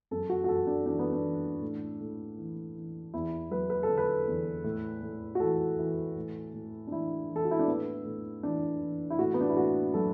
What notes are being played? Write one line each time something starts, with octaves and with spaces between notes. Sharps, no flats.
F#2 A4
F#4
F#4
F#2 A4
D4
E3 D4
B3
D4
E3
A2
A2
E3
E3
E2 E4
F#3 B4
B4
A4
D3
B4
E2
A2
A2
F#4
E3 A4
E3
A2
A2
D4
E3 E4
E3
A4
F#4
E4
D4
A2 B3
A2
E3 D4
E3
E4
A2 F#4
B3
D4
E4
A2 F#4
F#3 A4